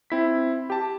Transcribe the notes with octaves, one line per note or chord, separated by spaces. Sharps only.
C4 E4 B6
G4 A5